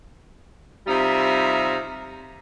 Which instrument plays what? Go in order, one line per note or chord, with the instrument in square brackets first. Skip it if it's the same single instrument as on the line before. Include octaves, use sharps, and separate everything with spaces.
[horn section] C3 G3 D#4 F4 E5 A#5